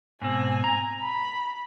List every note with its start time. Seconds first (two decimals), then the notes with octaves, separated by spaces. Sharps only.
0.22 G#2 B2 C4 G#5
0.64 A#5
1.02 B5